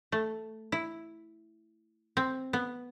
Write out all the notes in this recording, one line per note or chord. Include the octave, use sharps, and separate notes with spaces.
A3
E4
C4
B3